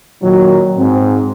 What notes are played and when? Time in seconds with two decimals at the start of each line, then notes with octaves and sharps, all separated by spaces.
0.23 A#2 D#3 F#3
0.77 G#2 C4